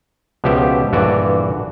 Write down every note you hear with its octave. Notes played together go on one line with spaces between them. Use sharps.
C#2 B2 F3 G4 E5 G5
A#1 G2 D3 E3 F#4 D5